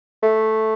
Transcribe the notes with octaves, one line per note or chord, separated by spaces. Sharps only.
A3